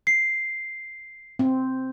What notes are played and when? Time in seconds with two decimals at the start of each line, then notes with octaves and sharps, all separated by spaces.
0.07 C7
1.39 C4